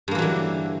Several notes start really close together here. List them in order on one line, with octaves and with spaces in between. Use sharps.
G2 A#3 E3 F#3 D3